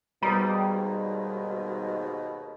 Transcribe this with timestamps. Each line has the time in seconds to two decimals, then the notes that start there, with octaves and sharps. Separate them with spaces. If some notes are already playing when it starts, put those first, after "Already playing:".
0.23 D#2 G#2 B2 G3 G#4 A#5